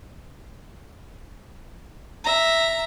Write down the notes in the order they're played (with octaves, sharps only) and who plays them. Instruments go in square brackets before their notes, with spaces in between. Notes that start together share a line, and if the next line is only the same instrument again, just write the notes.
[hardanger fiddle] E5 A#5